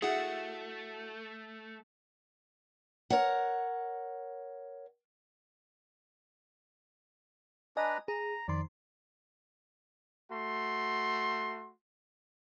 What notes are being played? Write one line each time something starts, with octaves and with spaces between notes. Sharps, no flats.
A3 E4 F#4 G#4 F#5
A#4 C#5 F#5
D4 B4 D#5 G#5 A#5
G#4 A#5
F2 D#3 D5 C6
A3 F#4 C6